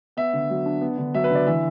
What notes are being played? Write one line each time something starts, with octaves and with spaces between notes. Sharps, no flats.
B3 E5
D3
F#3
D4
B3
D3
F#3 E5
B4
D3 D5
E3 E5